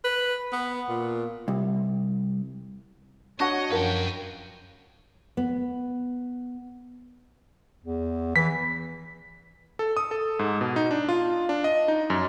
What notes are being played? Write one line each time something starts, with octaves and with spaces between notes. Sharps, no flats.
B4
B3
A#2
C2
D4 F#4 C#5 D#5 F#5
F#2 F3 A#4 B4 G5
B3
E2
E3 B6
A4
D#6
A4
G#2
B2
D#4
D4
F4
D4
D#5
D#4
F#2